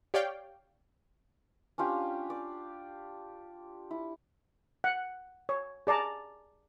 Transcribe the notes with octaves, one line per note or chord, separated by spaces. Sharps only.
G4 C#5 D5 F5 G5
C#4 D4 F4 G4
D5
E4
F#5
C#5
G#4 D5 A5 A#5